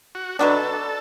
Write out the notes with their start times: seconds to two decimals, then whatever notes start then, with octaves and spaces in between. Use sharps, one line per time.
0.15 F#4
0.39 B2 F#3 B3 D4 A4